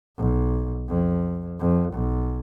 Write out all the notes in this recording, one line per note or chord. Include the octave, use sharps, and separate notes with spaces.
B1
F2
F2
B1